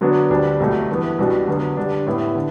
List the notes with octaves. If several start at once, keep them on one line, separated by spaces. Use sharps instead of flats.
D3 F#3 B3 D4 F#4
D2 D3 G3 D4
C2 B2 F#3 A3
G2 E3 B3
C2 B2 G3 D4 F#4
D3 F#3 B3
D3 G3 D4
A2 G3 B3 E4
D3